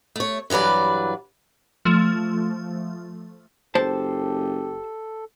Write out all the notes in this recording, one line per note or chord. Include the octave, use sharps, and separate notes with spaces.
A3 C#5
G2 E3 F#3 B4 D5
F3 A3
F#1 G4 A4 C5 A5